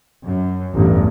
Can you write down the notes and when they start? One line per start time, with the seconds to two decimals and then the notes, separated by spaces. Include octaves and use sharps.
0.24 F#2
0.73 A1 E2 G2